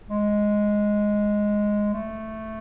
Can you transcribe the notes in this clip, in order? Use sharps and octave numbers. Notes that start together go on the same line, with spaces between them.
G#3
A3